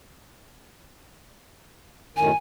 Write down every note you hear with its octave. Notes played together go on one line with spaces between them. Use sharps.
F#2 A2 D#3 G#5